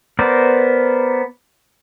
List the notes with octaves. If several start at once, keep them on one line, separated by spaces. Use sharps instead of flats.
B3 A#4 C5 D5